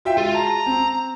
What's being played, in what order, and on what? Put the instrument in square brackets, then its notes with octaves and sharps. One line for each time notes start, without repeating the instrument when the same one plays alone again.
[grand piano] F4 E5 G5 [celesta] F#4
[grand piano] G#3 [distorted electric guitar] F4
[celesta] A5 [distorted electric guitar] A#5
[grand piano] C4